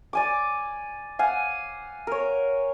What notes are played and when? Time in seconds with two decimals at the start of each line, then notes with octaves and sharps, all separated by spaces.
0.13 D5 G#5 D6
1.19 F5 F#5 G#5
2.07 A#4 C#5